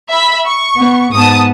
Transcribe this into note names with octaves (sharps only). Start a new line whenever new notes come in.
E5 B5 B6
C#6
B3
G#2 B3 A5 D#6